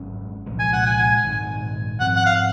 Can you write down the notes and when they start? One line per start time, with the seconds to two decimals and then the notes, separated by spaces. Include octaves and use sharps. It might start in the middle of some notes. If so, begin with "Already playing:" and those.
Already playing: G#1 G#2 F#3 C#4
0.46 C2 A#2 F3 G#3
0.59 G#5
0.73 F#5
0.86 G#5
1.23 A#1 G#2 D#3
2.00 G#2 F3 C4 F#5
2.16 F#5
2.26 F5